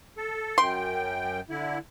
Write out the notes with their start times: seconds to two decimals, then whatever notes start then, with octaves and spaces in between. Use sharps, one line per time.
0.17 A4
0.58 F#2 G5 C6
1.50 D3 E4